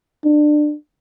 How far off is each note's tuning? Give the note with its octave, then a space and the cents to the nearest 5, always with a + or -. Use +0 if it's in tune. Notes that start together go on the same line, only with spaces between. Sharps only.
D4 +25